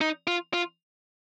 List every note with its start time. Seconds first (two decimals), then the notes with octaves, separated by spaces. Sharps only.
0.01 D#4
0.27 F4
0.53 F4